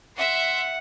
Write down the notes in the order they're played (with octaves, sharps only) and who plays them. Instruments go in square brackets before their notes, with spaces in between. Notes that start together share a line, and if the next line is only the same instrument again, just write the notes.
[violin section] E5 C6 [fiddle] F#5